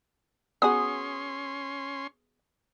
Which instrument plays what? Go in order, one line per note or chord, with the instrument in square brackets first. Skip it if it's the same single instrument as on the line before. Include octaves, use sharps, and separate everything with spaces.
[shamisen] B3 F#4 G#4 [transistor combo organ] C#4 C6 [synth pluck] D#6